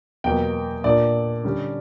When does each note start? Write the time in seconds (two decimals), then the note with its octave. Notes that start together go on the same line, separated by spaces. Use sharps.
0.24 E2 B2 F#3 A#3 G5
0.84 A#2 A#3 D4 D5
1.44 D3 G3 C#4